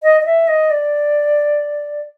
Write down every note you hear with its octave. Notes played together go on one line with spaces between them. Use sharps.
D#5
D#5
E5
D#5
D5